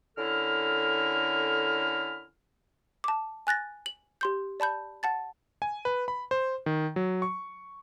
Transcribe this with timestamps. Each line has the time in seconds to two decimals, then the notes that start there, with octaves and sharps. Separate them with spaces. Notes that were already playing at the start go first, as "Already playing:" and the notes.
0.17 D3 C#4 E4 A4 A#4 F6
3.04 A5 D6
3.47 G#5 F#6 A6 A#6
3.86 F#7
4.21 G4 C6 G6
4.60 D5 A5 B5 G6
5.03 F#5 A5 A6
5.62 G#5
5.85 B4
6.08 B5
6.31 C5
6.66 D#3
6.96 F#3
7.22 C#6